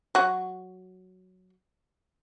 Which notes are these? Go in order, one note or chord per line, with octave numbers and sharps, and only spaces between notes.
F#3 F#4